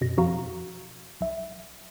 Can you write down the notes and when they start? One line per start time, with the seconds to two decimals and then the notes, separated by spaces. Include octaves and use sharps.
0.01 F#2 B2 A#6
0.17 F2 F3 F#4 F5 A#5
1.21 B1 E5